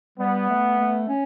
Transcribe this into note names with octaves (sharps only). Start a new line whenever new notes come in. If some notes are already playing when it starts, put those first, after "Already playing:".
G3 B3
A3
A3
C#4